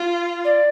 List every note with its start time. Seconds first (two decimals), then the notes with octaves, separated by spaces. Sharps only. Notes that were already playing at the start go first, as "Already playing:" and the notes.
Already playing: F4
0.44 D5